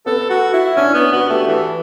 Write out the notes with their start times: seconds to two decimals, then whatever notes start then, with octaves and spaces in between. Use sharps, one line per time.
0.06 B3 A4
0.30 F#4
0.53 E4
0.76 C#4 D4
0.94 B3
1.12 B3 F#4
1.30 A3 G4
1.47 E3 A4